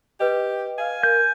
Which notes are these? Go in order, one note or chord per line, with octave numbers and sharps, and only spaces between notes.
G4 B4 D#5
F5 G#5
A#4 G6